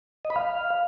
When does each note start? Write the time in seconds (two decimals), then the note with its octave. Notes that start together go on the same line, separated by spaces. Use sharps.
0.25 D#5
0.30 B5
0.36 F5